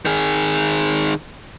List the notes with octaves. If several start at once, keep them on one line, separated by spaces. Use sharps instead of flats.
D#3 G#4